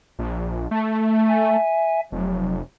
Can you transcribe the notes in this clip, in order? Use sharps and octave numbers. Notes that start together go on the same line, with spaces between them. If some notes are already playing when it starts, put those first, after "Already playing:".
A#1
A3
E5 G#5
F1 F#3